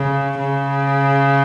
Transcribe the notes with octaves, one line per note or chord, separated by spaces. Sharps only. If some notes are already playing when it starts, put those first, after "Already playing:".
Already playing: C#3
C#3